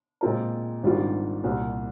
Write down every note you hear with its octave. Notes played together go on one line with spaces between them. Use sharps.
A#2 G#3 C4 F4 A#4
G#1 G#2 G3 D4 F4
C2 A#2 G3